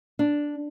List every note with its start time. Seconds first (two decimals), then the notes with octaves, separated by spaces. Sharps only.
0.19 D4